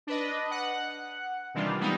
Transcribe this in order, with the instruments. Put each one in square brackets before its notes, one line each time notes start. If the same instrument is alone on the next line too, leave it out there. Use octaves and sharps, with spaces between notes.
[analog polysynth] D4 B4 D#5
F#5
C3 D#3 E3 G3 D4 F4
E3 G3 G#3 B3 D#4